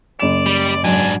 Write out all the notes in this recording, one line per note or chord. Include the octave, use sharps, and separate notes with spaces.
F#1 D5 E7
G3
G#2 F#3 D4 G#5